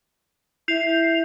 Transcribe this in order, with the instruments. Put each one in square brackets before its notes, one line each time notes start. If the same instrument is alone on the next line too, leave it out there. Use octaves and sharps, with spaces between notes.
[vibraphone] E4 E5 [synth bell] G6 C7 F7